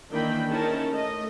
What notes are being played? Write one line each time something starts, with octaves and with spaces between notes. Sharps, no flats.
D#3 E3 A#3 D4 G5 B5
C#4 D#4 E4 G#4 A#4 A5
A3 D#5